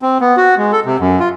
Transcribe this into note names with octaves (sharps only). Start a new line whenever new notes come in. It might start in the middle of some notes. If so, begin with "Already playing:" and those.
C4
B3
F#4
G#3
A4
C3
F#2
F4